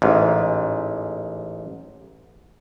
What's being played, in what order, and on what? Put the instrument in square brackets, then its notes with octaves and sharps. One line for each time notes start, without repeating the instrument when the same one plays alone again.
[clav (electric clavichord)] A1 G#2